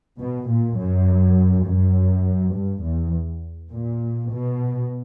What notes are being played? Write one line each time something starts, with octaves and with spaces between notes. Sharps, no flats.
B2
A#2
F#2
F#2
G2
E2
A#2
B2